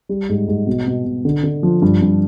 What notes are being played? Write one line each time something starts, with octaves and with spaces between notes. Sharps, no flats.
G3
G#2
G#2
B2
B2
B2
D3
D3
F3
G2
G2